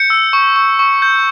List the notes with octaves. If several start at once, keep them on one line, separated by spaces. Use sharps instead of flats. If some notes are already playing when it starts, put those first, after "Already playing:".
Already playing: G6 C#7
E6
C#6
C#6
C#6
G6